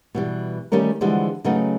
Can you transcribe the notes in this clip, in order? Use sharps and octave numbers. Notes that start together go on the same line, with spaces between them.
B2 E3 G3
D#3 G3 A3 C#4 A#4
D3 E3 F3 G3 G#3 B3
C#3 F#3 A3 B3 C#4 D#4